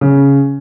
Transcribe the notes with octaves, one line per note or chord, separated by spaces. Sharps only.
C#3